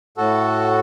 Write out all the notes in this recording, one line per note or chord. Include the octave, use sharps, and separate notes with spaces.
A2 F#4 A4